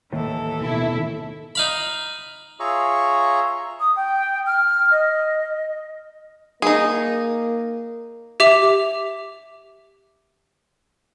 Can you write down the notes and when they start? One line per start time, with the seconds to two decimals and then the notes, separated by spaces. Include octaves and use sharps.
0.12 D#2 A2 E3 A4
0.61 B2 D#3 A3 E4
1.55 D#4 F5 B5
2.60 F4 G#4 C#5 E5 A#5 C#6
3.80 D#6
3.96 G5
4.46 F6
4.91 D#5
6.62 A#3 D#4 G#4
8.40 G4 E5 D6 F7